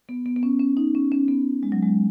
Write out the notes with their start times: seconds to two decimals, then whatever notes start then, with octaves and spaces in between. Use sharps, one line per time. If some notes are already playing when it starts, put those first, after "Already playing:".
0.09 B3
0.26 B3
0.36 B3
0.43 C#4
0.60 C#4
0.77 D#4
0.95 C#4
1.12 C#4
1.28 B3
1.63 G#3
1.72 F#3
1.82 G#3